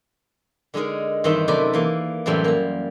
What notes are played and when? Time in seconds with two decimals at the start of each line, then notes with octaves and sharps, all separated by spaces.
0.74 D3 G#3 D#4 G#4 A#4
1.24 G2 D#3 E3 C4 D#4 E5
1.48 F#2 C3 A3 A#4 B4 D5
1.73 E3 A#3
2.26 F#2 A2 C3 E3 G3 A3
2.44 A#3 A#5